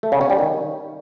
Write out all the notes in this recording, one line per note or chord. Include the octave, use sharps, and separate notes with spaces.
A3
C#3
C#4
G3
D#3